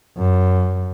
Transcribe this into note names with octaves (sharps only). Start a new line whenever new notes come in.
F#2